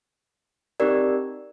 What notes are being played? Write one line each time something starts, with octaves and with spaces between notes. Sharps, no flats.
C4 D#4 G4 A#4 D5